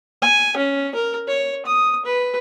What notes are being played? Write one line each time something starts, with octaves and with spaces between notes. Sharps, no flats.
G#5
C#4
A#4
C#5
D#6
B4